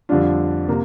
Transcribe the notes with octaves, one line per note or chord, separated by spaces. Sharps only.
F2 D3 G3 D4 F4
C3 A#3